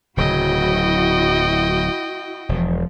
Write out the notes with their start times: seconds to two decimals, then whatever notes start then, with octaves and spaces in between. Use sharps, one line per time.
0.17 D1 C#3 F#3 E4 F#4 D#5 G5
2.49 E1 F3